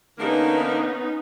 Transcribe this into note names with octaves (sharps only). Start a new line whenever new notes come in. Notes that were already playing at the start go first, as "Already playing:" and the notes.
D3 E3 A#3 B3 C#4 D#4